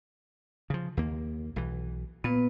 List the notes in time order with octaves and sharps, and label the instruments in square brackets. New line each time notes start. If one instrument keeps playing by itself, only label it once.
[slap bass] C#3 F3
D#2 A#3
B1 E3
[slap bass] A#2 [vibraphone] B3 B4